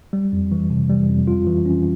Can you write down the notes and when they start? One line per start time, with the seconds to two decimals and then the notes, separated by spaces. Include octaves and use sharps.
0.13 G3
0.33 F2
0.52 E3
0.70 C3
0.90 G3
1.09 F2
1.28 F4
1.47 E3
1.66 C#4